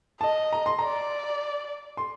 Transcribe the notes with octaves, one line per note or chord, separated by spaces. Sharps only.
D#5 A5
A#5
C6
A#5
D5
C6